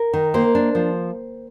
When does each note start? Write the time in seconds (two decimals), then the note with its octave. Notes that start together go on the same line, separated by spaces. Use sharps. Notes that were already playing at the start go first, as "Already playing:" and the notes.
Already playing: A#4
0.14 D#3
0.34 A#3 C5
0.55 D4
0.75 F3